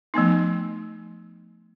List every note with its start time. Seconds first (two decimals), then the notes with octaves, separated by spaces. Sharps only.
0.14 F3 A3 B3 D#4